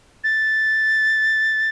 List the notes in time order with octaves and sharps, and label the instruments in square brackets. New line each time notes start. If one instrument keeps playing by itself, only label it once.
[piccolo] A6